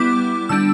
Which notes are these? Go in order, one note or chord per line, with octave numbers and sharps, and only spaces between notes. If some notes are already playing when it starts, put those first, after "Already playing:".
Already playing: G3 B3 E4 D6
D3 G3 D4 E6